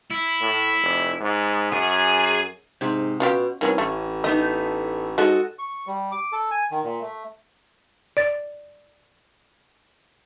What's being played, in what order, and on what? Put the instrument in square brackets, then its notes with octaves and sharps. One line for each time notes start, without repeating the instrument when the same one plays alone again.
[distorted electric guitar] E4
[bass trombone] A2
F1
G#2
[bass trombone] F#2 [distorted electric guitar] G#4
[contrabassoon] G#2 [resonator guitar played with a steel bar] C3
[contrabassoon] B2 [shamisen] C#4 F4 G4
[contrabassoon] C2 [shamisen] D#3 E3 F#3 [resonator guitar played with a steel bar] C#4
[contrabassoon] A1 [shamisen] A3
[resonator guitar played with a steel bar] A3 B3 D#4 [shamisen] D#5
[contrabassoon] G#2 [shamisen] G#3 [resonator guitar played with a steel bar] F#4 A4 D#5
[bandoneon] C#6
G3
D6
A4
G#5
D#3
A#2
A3
[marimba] D5 A6